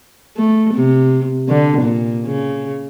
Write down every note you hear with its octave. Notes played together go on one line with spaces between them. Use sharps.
A3
C3
D3
A#2
C#3